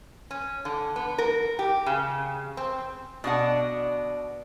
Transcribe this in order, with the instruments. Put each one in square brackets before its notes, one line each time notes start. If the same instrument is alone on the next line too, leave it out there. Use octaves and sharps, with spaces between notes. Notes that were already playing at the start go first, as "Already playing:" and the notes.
[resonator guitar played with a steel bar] C#4
D3
B3
A#4
G4
C#3
C4
B2 D4 F#5